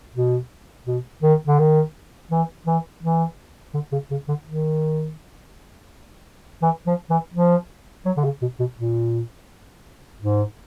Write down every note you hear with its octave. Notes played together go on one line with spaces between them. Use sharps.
B2
B2
D#3
D3
D#3
E3
E3
E3
D3
C#3
C#3
D3
D#3
E3
F3
E3
F3
F#3
D3
C#3
B2
B2
A#2
G#2